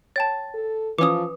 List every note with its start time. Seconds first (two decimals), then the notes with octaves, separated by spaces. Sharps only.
0.16 C#5 G5 A5 A6
0.55 A4
0.98 E3 F3 C#4 B4 D6 D#6